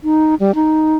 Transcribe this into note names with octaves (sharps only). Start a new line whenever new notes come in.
D#4
G3
D#4